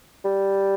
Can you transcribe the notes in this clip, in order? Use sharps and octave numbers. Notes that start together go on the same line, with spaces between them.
G3